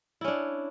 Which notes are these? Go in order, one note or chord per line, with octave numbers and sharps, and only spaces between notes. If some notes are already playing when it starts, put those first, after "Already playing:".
C#4 D4 E4